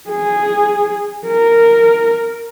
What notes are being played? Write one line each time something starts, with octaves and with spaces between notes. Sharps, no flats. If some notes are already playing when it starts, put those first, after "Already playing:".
G#4
A#4